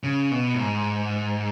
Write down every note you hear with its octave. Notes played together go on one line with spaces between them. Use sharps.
C#3
B2
A2
G#2